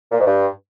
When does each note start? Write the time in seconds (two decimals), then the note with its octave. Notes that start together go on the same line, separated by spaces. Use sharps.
0.12 A#2
0.18 G#2
0.25 G2